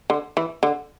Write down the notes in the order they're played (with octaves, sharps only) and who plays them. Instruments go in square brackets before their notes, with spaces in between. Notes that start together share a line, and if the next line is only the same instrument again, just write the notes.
[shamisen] D3
E3
D3